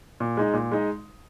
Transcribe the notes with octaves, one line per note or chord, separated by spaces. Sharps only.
A#2
G#3 D#4
A#2
G#3 D#4